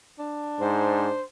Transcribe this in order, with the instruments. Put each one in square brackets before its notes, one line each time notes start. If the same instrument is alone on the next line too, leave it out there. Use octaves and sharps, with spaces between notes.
[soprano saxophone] D4
[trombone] G#2 [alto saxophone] C5